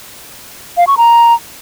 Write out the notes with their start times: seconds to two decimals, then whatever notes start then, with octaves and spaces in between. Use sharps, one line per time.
0.77 F5
0.87 C#6
0.97 A#5